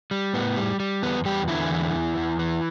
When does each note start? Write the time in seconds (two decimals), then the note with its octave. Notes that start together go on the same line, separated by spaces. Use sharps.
0.11 G3
0.34 A2 B3
0.56 G3
0.80 G3
1.03 E2 B3
1.25 E2 G3 G4
1.48 D3 E3 E4
1.71 E2
1.94 E2
2.17 E2
2.39 E3